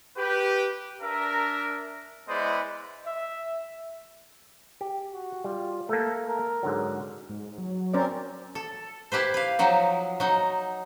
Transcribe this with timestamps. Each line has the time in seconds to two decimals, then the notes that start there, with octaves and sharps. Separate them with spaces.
0.16 G4 B4
1.01 D4 A#4 E5
2.28 G#3 B3 E4 C5 D5 D#5
3.06 E5
4.81 G4
5.13 F#4
5.44 G3 F4
5.89 A3 A#3 A4
6.27 A#4
6.63 G#2 D3 F#3
7.30 G#2
7.58 F#3
7.93 C4 C#4 A#4 C5 D5
8.55 A4
9.12 E4 G4 B4 C5
9.34 B4 F5
9.59 F3 F#3 D#4
10.20 F#3 D#4